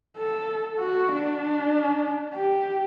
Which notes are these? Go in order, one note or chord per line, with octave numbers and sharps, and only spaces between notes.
A4
F#4
D4
G4